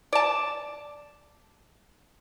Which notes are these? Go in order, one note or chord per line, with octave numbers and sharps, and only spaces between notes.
D5 A5